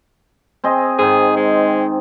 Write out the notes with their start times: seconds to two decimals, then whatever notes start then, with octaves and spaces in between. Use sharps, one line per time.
0.64 C4 G#4 D#5
0.99 G#2 D#3 G#4
1.36 G#3